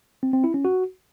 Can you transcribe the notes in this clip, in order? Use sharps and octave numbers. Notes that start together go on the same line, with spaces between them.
C4
C4
E4
C#4
F#4